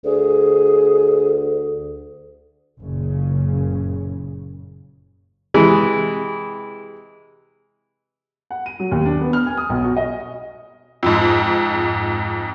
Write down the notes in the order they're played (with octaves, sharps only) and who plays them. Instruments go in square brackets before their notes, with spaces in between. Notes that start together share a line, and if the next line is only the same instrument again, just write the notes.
[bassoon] D2 [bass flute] G#4
[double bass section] F#1 F#2 A#2 C#3 C#4
[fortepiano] C3 E3 G#3
[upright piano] F#5
D#7
F#3
D#2
D4
B3
F6
G#5
D#6
B1
F#4
D#5
[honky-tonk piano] F2 G#2